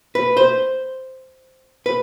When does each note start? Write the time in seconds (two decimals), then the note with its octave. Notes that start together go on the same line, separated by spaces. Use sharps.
0.15 B4
0.37 C5
1.86 B4